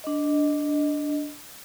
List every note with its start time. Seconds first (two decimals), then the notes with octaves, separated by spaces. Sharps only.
0.04 D4 D#5